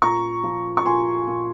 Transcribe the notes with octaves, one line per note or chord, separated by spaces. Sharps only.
A#2 A#5 C#6
F3
C#6
A#2 G#5 C6
A#2